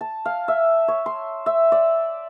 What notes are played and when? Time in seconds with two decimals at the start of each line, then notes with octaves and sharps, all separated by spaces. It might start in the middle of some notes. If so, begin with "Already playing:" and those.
0.01 A5
0.25 F5
0.48 E5
0.88 C#5
1.06 C6
1.46 E5
1.72 D5